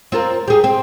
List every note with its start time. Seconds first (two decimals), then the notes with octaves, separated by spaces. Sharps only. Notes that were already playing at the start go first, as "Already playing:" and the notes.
0.12 C4 F4 A#4
0.48 G4 G#4
0.64 C4